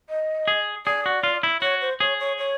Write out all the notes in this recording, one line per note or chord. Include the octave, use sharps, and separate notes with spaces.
D#5
G#4
G#4 D5
F#4
F4
E4
F#4 C#5
C5
G#4 C#5
C#5
C#5